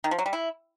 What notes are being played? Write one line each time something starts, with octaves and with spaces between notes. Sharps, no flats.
D#3
F3
F#3
G3
E4